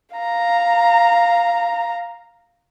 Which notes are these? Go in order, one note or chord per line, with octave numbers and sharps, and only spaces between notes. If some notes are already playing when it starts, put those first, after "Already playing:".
F5 A#5